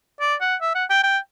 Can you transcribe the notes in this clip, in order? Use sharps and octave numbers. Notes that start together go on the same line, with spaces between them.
D5
F#5
E5
F#5
G5
G5